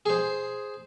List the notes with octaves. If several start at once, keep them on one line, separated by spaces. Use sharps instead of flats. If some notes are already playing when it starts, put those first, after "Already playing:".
G#4 C5